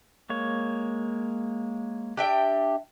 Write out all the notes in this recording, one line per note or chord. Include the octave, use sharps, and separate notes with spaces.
G#3 A#3 C#5
D4 G4 E5 G5